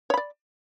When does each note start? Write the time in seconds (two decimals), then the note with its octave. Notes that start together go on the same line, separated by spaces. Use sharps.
0.10 C#5
0.14 B5
0.17 D5